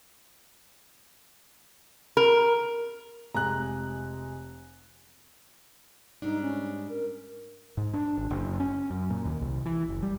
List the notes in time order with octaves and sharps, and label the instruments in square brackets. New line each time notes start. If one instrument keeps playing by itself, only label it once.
[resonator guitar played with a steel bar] A#4
[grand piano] F1 G#3 G#5 [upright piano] A#5 F#6
[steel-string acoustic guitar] G#2 G3 D4 [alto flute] D#4
[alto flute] C#4
A#4
[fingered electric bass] G#2
D4
G#1
F#1
C#4
F#2
A#2
D#2
C2
E3
F#1
G3